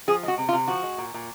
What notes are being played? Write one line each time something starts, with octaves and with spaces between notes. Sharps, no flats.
F3 G#4
G#3 F#4
C3
F4
C3
F3 F#4
G#3
A#2
A#2